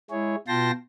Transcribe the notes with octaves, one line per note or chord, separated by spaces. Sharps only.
G#3 E4 G#4 C#5
B2 F4 G5 A5 C6 A#6